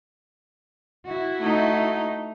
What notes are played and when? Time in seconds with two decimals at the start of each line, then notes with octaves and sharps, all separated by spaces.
1.05 E4 F#4
1.39 A3 D#4